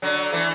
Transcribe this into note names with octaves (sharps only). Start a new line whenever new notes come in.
D3 F#3
E3 A3